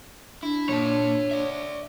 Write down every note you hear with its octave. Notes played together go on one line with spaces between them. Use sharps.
D4 E4
A#2 C#5 A5
D5 E5